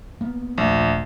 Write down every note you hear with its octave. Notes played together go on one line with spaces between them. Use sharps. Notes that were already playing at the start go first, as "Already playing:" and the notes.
A#3 B3
D#1 A#1 A3